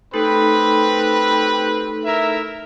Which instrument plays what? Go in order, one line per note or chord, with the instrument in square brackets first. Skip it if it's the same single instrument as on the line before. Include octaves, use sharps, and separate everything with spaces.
[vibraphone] A3 D#4 A4 [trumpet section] C4 G4 B4
[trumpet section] E4 A#4 E5